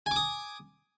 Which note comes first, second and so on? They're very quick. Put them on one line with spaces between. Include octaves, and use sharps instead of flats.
G#5 D6 D#6